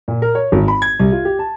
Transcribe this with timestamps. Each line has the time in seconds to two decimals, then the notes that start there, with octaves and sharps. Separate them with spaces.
0.08 A#2
0.22 A#4
0.35 C#5
0.52 G#1
0.68 B5
0.82 G#6
0.99 C2
1.12 F4
1.25 G4
1.39 A5